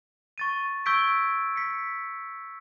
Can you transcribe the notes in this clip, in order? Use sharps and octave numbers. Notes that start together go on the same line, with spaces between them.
C#6 A6 D#7
C#6 E6 G6 G#6 B6 D7
B6 C#7